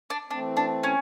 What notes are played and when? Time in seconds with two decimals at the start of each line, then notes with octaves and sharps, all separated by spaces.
0.10 D4
0.30 E3 A3 C4 D4
0.57 D4
0.83 C#4